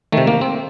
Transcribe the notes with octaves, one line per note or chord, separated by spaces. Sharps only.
C3 D#3 A3
A#3
C4